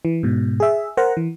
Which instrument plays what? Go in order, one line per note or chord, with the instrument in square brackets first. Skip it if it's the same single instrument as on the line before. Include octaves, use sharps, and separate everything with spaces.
[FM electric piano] E3
G#2 B2
G#4 E5
A#4 C5 F#5 A#5
E3